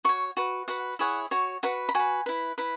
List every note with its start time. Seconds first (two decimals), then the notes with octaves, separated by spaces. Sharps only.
0.04 F#4 C#5 C#6
0.37 F#4 B4
0.68 F#4 B4 F#5
0.99 E4 G#4 C#5 F#5
1.31 F#4 C#5
1.63 F#4 B4 F#5
1.89 B5
1.95 F#4 B4 G#5
2.26 E4 B4
2.58 E4 B4